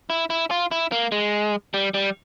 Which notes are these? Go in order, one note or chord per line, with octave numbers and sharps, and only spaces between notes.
E4
E4
F4
E4
A#3
G#3
G3
G3